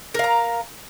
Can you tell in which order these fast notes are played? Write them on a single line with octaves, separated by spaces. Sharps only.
A#4 F5 A#5